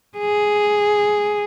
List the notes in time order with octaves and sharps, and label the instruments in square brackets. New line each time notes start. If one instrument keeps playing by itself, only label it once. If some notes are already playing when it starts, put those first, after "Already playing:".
[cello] G#4